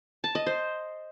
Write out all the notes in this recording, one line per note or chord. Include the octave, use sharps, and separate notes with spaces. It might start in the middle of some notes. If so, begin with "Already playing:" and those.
A5
D#5
C5